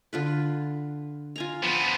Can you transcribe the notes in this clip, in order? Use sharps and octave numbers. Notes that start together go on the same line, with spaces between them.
D3 F4 B4
F4 G#5 A#5
F3 B3